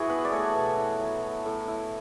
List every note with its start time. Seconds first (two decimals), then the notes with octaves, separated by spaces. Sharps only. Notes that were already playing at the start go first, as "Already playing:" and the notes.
Already playing: E3 E4 F#4 G#4
0.10 B3 B4
0.25 D5
0.32 A3 C#5
0.55 B2
0.77 E4
1.00 F#3
1.23 A3
1.46 A2
1.68 E4